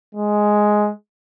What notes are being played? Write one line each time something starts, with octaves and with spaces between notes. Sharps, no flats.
G#3